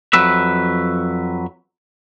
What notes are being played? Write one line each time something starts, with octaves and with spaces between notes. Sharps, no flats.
F2 F#3 B4 E5